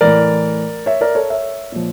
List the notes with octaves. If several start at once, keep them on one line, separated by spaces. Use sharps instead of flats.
A2 E3 A#4 D5
C#5 E5
A#4 D5
A4 C#5
C#5 E5
A#2 F3